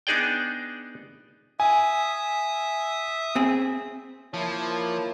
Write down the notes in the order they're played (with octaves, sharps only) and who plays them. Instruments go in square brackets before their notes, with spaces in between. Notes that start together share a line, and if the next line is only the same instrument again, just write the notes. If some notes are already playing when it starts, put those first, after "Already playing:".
[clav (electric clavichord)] B3 D4 D#4 G#4 D5 G5
[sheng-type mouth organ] E5 D#6 [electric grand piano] G#5
[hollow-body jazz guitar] C4 G#4
[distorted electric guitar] F3 [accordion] A#3 E4 A5 [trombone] C#5